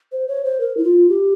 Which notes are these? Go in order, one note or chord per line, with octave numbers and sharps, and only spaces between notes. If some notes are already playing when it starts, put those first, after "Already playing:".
C5
C#5
C5
A#4
E4
F4
G4